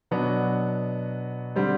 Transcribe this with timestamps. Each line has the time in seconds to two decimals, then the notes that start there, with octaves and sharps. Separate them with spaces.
0.11 B2 F#3 B3 D4 F#4
1.56 D3 G3 C4